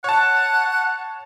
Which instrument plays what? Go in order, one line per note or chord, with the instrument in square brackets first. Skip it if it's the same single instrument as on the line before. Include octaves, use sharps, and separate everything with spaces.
[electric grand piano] C#5 A5 [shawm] F#5